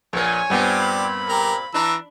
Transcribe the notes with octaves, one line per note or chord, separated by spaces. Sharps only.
A#1 A#2 B3 A#4 C#5 G#5
G2 A#2 B3 C4 D4 G4
B5
G4 A#4 A#5
E3 D4 A#5 E6